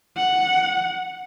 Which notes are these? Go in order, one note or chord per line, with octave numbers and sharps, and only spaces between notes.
F#5